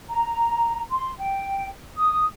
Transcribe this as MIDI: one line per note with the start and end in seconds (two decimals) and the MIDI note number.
0.09 0.81 82
0.91 1.11 84
1.19 1.68 79
1.94 2.24 87